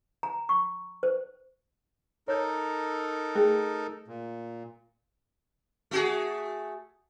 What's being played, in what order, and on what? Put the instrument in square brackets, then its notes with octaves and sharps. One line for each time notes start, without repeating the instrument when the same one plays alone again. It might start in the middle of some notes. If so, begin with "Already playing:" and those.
[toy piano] A#5
C#6
C5
[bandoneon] D#4 A4 A#4 [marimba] C#5 G6
[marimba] A3 G#4
[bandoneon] A#2
[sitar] A3 F#4 G#4